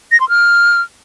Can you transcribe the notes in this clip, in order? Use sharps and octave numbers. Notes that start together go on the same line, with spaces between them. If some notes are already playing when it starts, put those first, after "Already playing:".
A#6
C6
F6